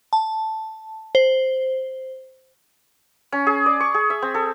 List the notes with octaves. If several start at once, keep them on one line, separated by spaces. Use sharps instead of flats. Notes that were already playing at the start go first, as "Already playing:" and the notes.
A5
C5
C#4
G#4
D5
C#6
G#4
E5
C4
A4